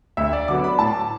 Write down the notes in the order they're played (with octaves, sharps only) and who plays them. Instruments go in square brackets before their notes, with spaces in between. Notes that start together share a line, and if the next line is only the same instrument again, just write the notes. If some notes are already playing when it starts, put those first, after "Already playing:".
[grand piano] D2 E5
D5
D3 F#3 B3 D6
B5
A2 A5